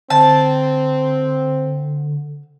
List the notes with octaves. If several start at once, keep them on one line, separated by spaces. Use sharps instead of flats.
D3 C4 A5